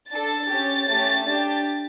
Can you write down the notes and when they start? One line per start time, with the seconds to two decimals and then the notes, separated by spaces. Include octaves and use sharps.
0.12 D4 A4 A6
0.50 C#4 G4
0.89 A3 C#4 G4
1.27 D4 G4